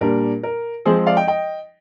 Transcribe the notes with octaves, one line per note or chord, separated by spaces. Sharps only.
A#2 G3 D4 A#4
A#4
F3 G#3 C4 G#4 C5
D5 F5
D#5 G5
D#5 G5